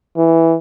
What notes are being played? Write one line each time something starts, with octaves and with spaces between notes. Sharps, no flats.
E3